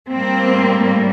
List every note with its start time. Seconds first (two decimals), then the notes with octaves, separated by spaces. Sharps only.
0.10 A2 G3 A#3 C4